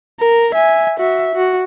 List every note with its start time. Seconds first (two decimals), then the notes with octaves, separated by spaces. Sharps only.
0.20 A#4
0.55 E5 G#5
0.99 F#4 E5
1.35 F#4